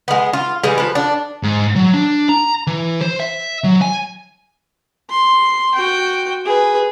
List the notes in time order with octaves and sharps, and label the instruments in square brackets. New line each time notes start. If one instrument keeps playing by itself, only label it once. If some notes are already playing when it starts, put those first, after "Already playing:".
[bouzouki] G#3 B3
F4
E3 G3 G#3
F3 B4
D4
[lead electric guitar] G#2
F#3
D4
A#5
E3
C5
E5
F#3
G#5
[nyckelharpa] C6
F#4 G5
G#4 B4